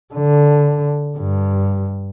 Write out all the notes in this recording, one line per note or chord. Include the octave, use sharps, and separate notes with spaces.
D3
G2